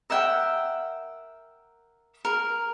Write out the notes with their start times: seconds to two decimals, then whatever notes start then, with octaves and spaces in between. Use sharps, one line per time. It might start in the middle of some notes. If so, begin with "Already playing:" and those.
0.10 A#4 E5 F#5 G5
2.25 A#4